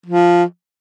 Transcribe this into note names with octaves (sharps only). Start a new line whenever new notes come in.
F3